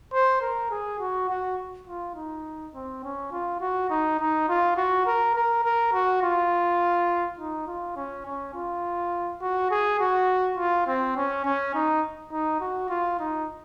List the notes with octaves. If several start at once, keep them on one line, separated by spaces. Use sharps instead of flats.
C5
A#4
G#4
F#4
F#4
F4
D#4
C4
C#4
F4
F#4
D#4
D#4
F4
F#4
A#4
A#4
A#4
F#4
F4
D#4
F4
C#4
C#4
F4
F#4
G#4
F#4
F4
C4
C#4
C#4
D#4
D#4
F#4
F4
D#4